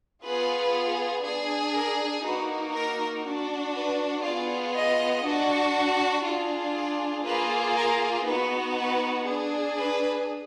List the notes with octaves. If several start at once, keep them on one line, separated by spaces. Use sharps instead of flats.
B3 F4 G#4 B4
D4 G#4
A#4
A#3 D#4 F#4 B4
A#4
D4 F#4
B4
B3 F4 G#4 D5
D#5
D4 F#4
D4 F4 G#4
D5
A#3 F4 G#4 B4
A#4
B3 D#4 F#4 B4
B4
D4 G#4
B4